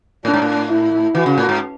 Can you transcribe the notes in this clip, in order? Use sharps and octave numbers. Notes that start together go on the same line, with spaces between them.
A2 D4
G#2
A2
E4
E3 F#4
C#3
A2
G#2